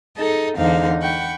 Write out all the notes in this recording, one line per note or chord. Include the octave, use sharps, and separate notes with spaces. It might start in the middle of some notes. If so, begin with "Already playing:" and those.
D#4 G#4 A4 D#5
E2 G#2 D3 D#4 F5
F#5 G5 B5 C#6